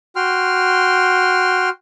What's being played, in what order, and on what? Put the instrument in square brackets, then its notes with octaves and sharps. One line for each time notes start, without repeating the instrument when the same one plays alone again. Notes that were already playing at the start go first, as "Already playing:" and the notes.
[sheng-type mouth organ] F#4 G5 C6 F6